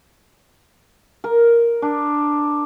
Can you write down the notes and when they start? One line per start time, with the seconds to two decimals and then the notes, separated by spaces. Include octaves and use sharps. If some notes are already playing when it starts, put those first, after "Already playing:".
1.24 A#4
1.82 D4